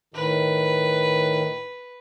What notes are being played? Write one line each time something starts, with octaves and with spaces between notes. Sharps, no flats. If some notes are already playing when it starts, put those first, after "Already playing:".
A2 D#3 B4